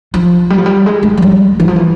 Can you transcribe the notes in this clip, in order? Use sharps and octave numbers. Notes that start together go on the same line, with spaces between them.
F3
G3
F3
G3
G#3
G#3
F3
G3
E3
F3
E3